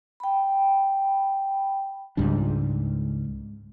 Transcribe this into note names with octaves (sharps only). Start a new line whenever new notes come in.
G5 B5
C#2 G#2 G3 D4